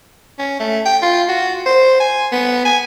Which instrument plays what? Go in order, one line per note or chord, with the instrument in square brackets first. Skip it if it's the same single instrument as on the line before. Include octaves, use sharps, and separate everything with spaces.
[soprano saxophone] C#4
A3
G5
F4
F#4
C5
G#5
B3
G#5